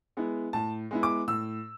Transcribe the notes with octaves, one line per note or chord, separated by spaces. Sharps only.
G#3 B3 E4
A2 A5
G#3 B3 E4
D6
A2 E6